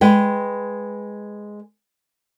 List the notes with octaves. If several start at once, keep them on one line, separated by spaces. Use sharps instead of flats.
G#3 B4 G5